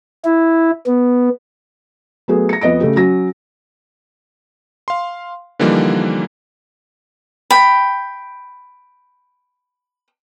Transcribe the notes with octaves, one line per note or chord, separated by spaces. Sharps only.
E4
B3
F#3 A3 B3 G#4
A#6 C#7
F2 B3 D#5 A#6 D7
C#3 A3 G4
F#3 C#4 A#6
F5 C6
D3 E3 F3 G3 A#3 D#4
G5 B5